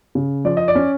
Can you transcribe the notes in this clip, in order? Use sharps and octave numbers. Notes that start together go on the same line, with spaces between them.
C#3
F3 D5
D#5
D5
C#4